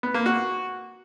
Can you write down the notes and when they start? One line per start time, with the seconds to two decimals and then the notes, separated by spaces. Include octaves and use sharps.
0.03 B3
0.14 A#3
0.26 F#4